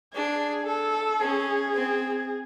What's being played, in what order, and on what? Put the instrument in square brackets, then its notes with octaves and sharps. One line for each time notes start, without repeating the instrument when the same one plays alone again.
[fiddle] D4 [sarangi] G#4
[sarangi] A4
[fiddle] C#4 [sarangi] G#4
[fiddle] C4